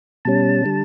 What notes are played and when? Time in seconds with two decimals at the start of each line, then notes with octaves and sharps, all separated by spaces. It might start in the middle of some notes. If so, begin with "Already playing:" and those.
0.25 B2 G3 C#4 A5
0.65 D3 G3